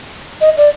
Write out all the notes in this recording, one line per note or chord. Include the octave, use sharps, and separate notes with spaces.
D#5
D5